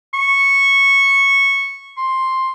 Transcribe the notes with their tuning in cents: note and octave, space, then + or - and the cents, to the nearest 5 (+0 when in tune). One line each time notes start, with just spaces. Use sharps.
C#6 -10
C6 +5